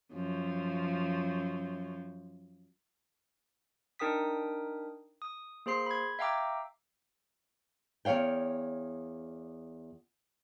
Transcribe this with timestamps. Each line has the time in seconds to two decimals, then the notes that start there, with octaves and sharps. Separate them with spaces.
0.14 F#2 F3
3.99 D4 D#4 A#4 G5 D#6 B6
5.22 D#6
5.66 A#3 G#4 C5 C6 C7
5.86 B5 G#6
6.19 E5 F5 G5 A#5 D6 E6
8.05 E2 D#3 C#5 F5 G5